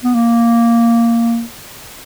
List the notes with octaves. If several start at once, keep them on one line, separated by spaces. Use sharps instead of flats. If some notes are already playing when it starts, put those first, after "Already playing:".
B3
A#3